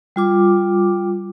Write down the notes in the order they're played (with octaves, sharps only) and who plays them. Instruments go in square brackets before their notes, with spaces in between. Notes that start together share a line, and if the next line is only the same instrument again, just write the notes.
[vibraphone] G3 F4 D6